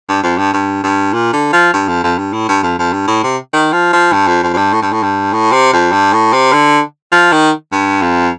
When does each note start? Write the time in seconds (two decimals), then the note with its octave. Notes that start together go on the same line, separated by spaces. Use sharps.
0.08 G2
0.23 F2
0.38 G2
0.53 G2
0.83 G2
1.14 A#2
1.33 D3
1.53 F3
1.73 G2
1.88 F2
2.04 F2
2.18 G2
2.33 A2
2.48 G2
2.63 F2
2.78 F2
2.93 G2
3.07 A2
3.23 C3
3.53 D#3
3.72 F3
3.93 F3
4.12 G2
4.27 F2
4.43 F2
4.53 F2
4.57 G2
4.73 A2
4.82 G2
4.92 A2
5.03 G2
5.33 A2
5.52 C3
5.73 F2
5.92 G2
6.13 A2
6.33 C3
6.52 D3
7.12 F3
7.32 D#3
7.72 G2
8.02 F2